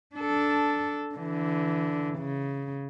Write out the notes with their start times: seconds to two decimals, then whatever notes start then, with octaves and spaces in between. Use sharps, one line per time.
0.16 D4 A4
1.15 D3 E3
2.19 C#3